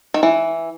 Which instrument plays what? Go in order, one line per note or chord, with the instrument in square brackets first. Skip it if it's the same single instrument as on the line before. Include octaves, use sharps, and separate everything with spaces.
[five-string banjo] D#3
E3